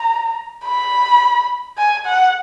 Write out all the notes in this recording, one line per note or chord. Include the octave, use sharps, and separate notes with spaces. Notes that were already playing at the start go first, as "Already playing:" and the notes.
Already playing: A#5
B5
G#5
F#5